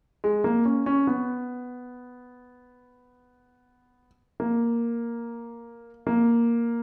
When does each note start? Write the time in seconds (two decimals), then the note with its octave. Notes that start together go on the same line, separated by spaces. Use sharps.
0.24 G#3
0.44 A#3
0.65 C#4
0.86 C#4
1.07 B3
4.40 A#3
6.07 A#3